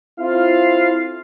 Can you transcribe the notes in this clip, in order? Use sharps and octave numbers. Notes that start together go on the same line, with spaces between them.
C4 E4 F4 A4 F5